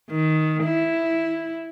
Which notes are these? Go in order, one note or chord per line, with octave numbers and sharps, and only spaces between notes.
D#3
E4